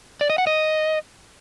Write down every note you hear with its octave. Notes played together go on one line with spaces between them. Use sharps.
D5
D#5
F#5
D#5